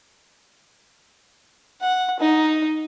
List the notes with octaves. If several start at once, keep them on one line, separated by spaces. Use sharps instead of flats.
F#5
D#4